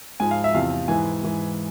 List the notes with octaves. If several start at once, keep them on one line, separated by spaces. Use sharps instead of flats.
G#2 F3 G#5
F5
E5
E2 C3 F3 F5
G#2 E3 G#5
G#2 E3